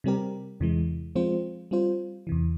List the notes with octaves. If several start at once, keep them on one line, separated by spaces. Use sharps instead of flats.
C3 G3 C4 G4 A#4
E2 C3 E3 G#3
F3 G#3 C4 F4 C5
G3 C4 F4 C5
E2 C3 E3